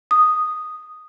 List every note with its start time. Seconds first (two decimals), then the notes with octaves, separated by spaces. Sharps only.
0.11 D#6